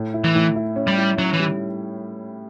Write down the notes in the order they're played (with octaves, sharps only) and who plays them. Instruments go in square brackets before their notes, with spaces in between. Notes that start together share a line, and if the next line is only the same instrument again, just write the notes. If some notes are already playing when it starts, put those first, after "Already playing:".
Already playing: [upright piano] A2
E4
[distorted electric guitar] E3
[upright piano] A2
E4
C#4
[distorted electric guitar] G3
[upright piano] E4
[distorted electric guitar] F#3 [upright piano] C#4
[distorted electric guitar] E3
[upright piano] G3